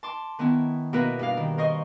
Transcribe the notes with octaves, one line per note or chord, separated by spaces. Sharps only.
A5 C6 D6
D#3 B3 C#4 E4
B2 A#3 D#4 E4 A#4 B4
G2 D4 F5
D#3
A#4 C5 D#5 C#6 D#6